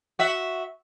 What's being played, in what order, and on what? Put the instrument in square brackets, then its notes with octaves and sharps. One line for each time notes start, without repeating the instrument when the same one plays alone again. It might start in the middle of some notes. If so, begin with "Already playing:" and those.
[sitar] F#4 E5